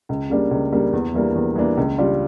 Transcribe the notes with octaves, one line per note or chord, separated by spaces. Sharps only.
C#2
C#3 G3 A#3 D4
C#2
C#3 G3 A#3 D4
E2
E3 G3 A#3 D4
E2
E3 G3 A#3 D4
C#2
C#3 G3 D4 F4